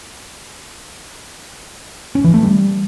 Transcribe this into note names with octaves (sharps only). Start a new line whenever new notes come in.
C#4
E3
A3
G3